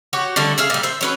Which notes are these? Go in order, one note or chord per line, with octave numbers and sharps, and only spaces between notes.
F#4 G4 C#5
D3 G3 A3
G#4 E5 F5
A#2 G3
C5 E5
F#3 C#4 B4